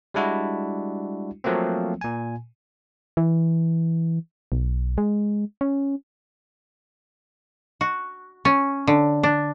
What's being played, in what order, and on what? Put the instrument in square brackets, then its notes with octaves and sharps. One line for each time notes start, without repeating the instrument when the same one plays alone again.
[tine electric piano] G3 G#3 D4 E4 F#4
F3 F#3 A3 A#3 C4
A#2 G#5
[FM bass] E3
B1
G#3
C#4
[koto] F#4
C#4
D3
D4